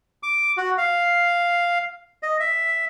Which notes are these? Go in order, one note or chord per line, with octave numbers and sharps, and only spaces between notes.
D6
F#4
F5
D#5
E5